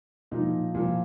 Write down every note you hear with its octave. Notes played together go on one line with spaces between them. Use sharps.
A#2 F3 D#4
A#2 F3